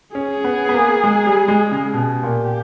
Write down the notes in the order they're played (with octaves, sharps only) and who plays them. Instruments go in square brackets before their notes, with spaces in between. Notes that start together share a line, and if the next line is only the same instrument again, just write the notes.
[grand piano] C#4 [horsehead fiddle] G#4
[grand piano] B3
B3
A#3
G#3
G3
G#3
C#3
[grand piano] B2 [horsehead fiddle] G4
[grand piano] A#2